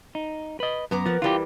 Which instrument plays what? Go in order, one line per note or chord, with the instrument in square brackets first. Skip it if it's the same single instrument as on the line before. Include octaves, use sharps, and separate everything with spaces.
[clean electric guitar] D#4
B4 D#5
[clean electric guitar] F#2 [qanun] B3 A#5 D6
[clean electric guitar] F3 [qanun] A#3 F#5
[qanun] E3 G3 [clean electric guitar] F4 G4